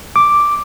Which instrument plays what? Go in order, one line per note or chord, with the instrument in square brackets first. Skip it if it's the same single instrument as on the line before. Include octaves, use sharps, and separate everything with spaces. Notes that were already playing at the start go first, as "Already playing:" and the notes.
[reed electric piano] D6